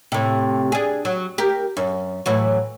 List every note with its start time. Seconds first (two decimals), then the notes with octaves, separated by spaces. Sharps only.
0.12 A2 C3
0.72 D4 G#4
1.05 F#3
1.38 G4 A#4
1.77 F#2
2.26 A2 E3 F#3